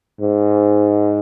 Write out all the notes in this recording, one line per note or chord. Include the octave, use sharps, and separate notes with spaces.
G#2